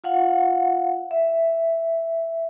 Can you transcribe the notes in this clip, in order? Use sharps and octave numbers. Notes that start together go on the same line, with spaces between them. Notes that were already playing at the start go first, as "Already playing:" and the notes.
F4 F5 F#5
E5